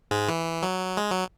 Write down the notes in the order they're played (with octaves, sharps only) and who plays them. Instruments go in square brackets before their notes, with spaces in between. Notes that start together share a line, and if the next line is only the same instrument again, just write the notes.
[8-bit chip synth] G#2 G#3
E3
F#3
G#3
F#3